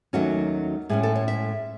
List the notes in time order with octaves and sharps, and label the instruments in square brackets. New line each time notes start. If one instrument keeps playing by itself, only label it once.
[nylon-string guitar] D#2 D#3 F#3 A3 C#4 F#4
A2 G#3 C#4 G#4
A4
C#5
E5